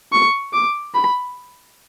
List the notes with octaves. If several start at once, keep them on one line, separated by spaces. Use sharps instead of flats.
C#6
D6
B5